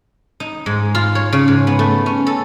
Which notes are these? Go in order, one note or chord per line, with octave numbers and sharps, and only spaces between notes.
D#4
G#2
F4
C#5
C#3
G#2
B3
A3
C#4
A4